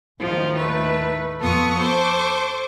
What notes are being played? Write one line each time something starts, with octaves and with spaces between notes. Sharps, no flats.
D#2 A2 D#3 F3
A3 B4
F2 B3 F4 A4 C#6 D#6
A4 C5 C#6 D6